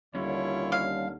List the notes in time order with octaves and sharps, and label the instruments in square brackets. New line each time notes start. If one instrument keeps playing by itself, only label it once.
[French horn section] D#2 D3 [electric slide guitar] G3 C#4 [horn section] E4 F4 C#5
[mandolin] F5